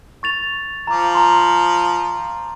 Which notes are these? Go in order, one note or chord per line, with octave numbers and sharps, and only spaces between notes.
C#6 A6 F7
F3 A#5 D6
A#5 C6